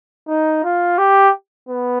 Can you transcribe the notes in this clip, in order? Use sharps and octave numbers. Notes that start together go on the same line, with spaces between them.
D#4
F4
G4
B3